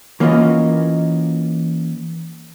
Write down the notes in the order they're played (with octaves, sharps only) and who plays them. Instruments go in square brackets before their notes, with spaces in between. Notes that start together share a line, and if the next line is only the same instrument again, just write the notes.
[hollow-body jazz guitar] E3 A#3 C#4 F4 F#4 D#5